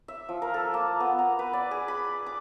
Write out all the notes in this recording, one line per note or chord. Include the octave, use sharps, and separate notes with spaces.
E5
F3
A#4
A4
A#3
B3
A#5
B4
D5
G#4
B5
D6